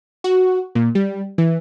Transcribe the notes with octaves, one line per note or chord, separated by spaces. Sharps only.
F#4
A#2
G3
E3